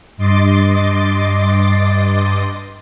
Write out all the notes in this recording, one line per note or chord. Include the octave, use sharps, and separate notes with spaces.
G2 D#5 C6 D6 A6